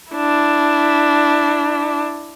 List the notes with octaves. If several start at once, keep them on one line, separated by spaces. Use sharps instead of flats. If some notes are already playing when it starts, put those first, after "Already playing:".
D4 E4